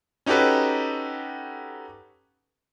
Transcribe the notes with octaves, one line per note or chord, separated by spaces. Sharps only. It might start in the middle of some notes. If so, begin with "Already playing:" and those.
C#4 D#4 F#4 G4 A4 B4